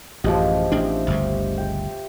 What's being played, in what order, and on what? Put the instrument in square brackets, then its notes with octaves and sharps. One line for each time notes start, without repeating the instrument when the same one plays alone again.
[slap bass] A1 F#2 [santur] F3 G#3 G4
[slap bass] A1 D4 [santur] C4 E5
[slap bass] G1 D2 C#3
[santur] G5